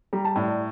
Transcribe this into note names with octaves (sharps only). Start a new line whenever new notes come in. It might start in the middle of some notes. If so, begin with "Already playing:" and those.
G3 A#5
A5
A2 D5
D5